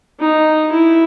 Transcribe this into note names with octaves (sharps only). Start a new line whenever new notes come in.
D#4
E4